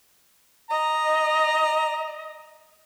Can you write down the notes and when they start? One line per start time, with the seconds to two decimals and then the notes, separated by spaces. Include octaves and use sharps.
0.71 D#5 A#5